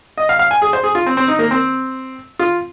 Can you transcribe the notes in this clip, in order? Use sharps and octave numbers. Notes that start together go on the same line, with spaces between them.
D#5
F5
F5
G#5
G#4
C5
G#4
F4
C4
C4
D#4
A#3
C4
F4